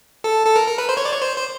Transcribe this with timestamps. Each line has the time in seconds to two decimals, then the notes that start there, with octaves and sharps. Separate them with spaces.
0.24 A4
0.46 A4
0.56 A#4
0.68 A#4
0.78 B4
0.89 C5
0.97 C#5
1.05 D5
1.13 C#5
1.22 C5
1.38 C5